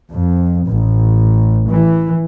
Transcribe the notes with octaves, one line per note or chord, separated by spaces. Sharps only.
F2
A1
E3